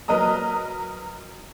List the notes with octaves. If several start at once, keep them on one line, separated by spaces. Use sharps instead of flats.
F#3 A#4 B4 D#5 A#5 D#6